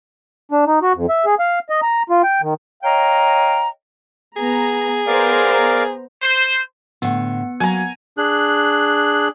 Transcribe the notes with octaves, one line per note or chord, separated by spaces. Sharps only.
D4
D#4
F#4
F2
E5
G#4
F5
D#5
A#5
F4
G5
D#3
C#5 D#5 F5 G5 A#5
B3 G#4 A#5
B3 A#4 C5 D5 F5 A#5
C5
A2 D3 B3 F#5
F#3 A#3 G#5 A#5
D4 G#4 F#6